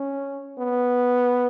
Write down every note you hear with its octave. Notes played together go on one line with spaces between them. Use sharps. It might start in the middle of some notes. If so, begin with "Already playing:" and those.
Already playing: C#4
B3